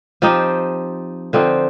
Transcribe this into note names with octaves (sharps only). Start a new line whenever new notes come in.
F3 C4 D#4 G4
D3 F3 C4 D#4